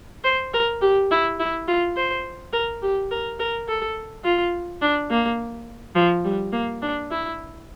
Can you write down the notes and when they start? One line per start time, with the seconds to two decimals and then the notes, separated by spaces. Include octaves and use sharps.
0.24 C5
0.54 A#4
0.81 G4
1.11 E4
1.40 E4
1.68 F4
1.96 C5
2.53 A#4
2.82 G4
3.11 A#4
3.39 A#4
3.68 A4
4.24 F4
4.82 D4
5.10 A#3
5.96 F3
6.24 G3
6.52 A#3
6.82 D4
7.11 E4